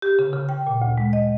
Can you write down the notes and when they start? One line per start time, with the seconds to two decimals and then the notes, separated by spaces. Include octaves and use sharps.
0.02 G4
0.19 C#3
0.33 C#3
0.49 G5
0.67 A#2
0.82 D2
0.98 G#3
1.13 D#5